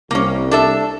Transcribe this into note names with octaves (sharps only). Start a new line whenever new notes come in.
C2 A#3 C#4
D4 A4 E5